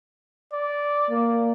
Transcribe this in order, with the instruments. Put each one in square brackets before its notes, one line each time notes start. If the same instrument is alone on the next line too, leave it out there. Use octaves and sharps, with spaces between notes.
[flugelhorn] D5
[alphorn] A#3